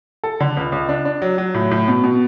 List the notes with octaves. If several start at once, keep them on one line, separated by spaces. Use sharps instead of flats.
A4
D3
C#2
C#2
D4
D4
F#3
F#3
A2
A2
B2
B2